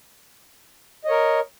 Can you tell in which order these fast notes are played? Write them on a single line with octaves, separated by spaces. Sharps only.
D#5 C#5 A#4